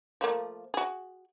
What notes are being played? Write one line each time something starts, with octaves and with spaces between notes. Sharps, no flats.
F3 A3 A#3
F#4 G#4